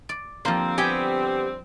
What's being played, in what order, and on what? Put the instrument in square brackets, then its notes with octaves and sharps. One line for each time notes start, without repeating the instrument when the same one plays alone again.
[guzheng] D5
[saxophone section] D3 G3 C4 [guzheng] F3 C5 [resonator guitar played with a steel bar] A#3
[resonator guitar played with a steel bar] B3 G4 G5 [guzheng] G#5